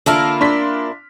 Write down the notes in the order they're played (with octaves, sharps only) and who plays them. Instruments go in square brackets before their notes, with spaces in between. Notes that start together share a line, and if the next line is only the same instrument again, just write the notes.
[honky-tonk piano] D3 A5 F6 [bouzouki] A#3 E4 F4
[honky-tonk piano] D4 C6 B6